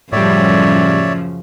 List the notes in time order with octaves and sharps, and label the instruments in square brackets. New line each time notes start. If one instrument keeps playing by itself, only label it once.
[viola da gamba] F#2 C#3 F3 [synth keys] A2 G3 [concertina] C#5 D5 E5